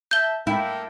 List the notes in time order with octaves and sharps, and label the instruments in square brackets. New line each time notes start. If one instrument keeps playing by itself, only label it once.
[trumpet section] E5 A5 [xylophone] G6 G7
[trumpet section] A#3 A4 G5 [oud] E4